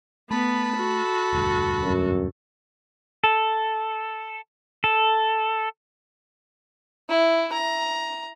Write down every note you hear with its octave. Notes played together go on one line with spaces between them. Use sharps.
A3 B3 A5 B5
F#4 A4
E1 D2 G2
F#2
A4
A4
E4
A#5